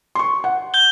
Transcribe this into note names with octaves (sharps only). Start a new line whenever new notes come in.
C6 C#6
F#5
G6 G7